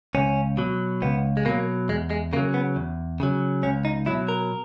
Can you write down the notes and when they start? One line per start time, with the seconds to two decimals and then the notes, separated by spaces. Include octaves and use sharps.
0.15 C#2 C#4
0.57 B2 F#3
1.02 C#2 B3
1.37 G#3
1.45 B2 F#3 A#3
1.89 E2 G#3
2.10 G#3
2.33 C#3 A#3
2.36 F#3
2.54 B3
2.76 E2
3.20 C#3 F#3
3.63 C#2 C#4
3.85 D#4
4.06 B2 F#3 E4
4.28 A#4